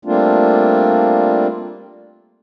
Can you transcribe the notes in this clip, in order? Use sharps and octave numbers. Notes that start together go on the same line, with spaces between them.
G3 A3 A#3 C4 D4 F4